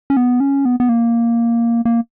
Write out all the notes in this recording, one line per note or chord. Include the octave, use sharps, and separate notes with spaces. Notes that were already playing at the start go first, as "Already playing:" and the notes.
C#4
B3
C#4
B3
B3
A#3
A#3